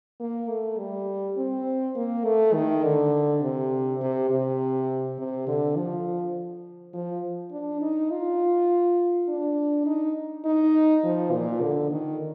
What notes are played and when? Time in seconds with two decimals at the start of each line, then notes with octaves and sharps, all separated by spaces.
0.20 A#3
0.50 A3
0.78 G3
1.37 C4
1.96 A#3
2.25 A3
2.54 D#3
2.84 D3
3.42 C3
4.01 C3
4.30 C3
5.18 C3
5.48 D3
5.77 F3
6.93 F3
7.52 D4
7.82 D#4
8.11 F4
9.29 D4
9.86 D#4
10.45 D#4
11.04 F3
11.33 A#2
11.62 D3
11.91 D#3